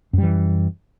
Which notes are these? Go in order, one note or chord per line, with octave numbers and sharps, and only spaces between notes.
F#2 E3 G3